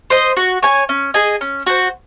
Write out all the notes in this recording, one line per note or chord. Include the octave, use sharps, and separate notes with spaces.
C5 D#5
F#4
C#5 G#5
C#4
G#4 D#5 G#5
C#4
F#4 C5